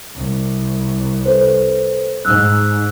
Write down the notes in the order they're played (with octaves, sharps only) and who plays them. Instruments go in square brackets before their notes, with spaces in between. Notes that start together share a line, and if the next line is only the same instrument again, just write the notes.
[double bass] C2
[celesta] A4 B4 C5
[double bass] G#2 [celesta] E6 F#6